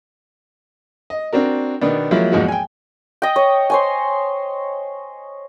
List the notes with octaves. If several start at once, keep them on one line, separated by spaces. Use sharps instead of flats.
D#5
C4 D4 F#4 A#4
B2 D#3 B3 D4
F3 F#3 G#3 A#3 E4
E2 G#2 F3 G#3 F#4 D#5
G5 G#5
D#5 G5
C#5
C5 C#5 G#5